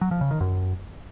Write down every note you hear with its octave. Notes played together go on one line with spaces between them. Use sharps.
F#3
F3
C#3
D#3
F#2